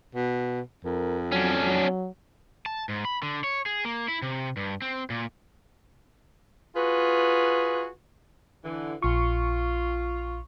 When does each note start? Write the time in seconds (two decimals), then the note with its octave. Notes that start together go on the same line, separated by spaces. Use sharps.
0.15 B2
0.85 F2 A#4
1.32 F#3 C#4 D4
1.64 F#3
2.66 A5
2.89 G#2
3.05 B5
3.23 D3
3.44 C#5
3.66 G#4
3.85 A#3
4.08 E4
4.22 C3
4.57 G2
4.82 C4
5.10 A#2
6.75 F4 F#4 G#4 B4
8.65 D3 E3
9.02 A#1 F4 C#6